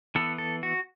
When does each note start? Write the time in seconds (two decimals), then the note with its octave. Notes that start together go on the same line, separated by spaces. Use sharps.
0.15 E3 B3 A4
0.38 A4
0.63 F#4